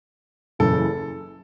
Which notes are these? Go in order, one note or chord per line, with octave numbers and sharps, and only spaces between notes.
F#1 F#2 C#3 E3 A4